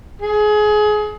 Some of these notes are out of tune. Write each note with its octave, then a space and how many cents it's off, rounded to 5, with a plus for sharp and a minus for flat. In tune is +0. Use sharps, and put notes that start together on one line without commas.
G#4 +25